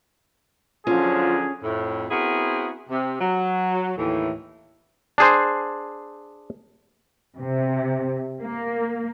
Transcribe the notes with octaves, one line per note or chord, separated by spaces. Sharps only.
D3 F3 F#3 C#4 F4 G#4
F2 A2
B3 C4 E4 F#4 G#4 A#4
C3
F#3
D#2 A2 E3
D4 G#4 C5
C3
A#3